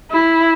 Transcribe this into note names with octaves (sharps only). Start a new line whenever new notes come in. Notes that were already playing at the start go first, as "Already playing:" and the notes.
E4